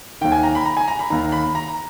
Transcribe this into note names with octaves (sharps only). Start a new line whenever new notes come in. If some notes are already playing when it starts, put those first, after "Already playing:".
D#2 D#3 G5
G#5
A#5
B5
A#5
G#5
A#5
B5
D#2 D#3 A#5
B5
A#5